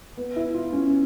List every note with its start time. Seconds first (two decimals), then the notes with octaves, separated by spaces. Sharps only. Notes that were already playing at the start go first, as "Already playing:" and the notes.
0.17 B3
0.36 E4
0.54 F4
0.72 C#4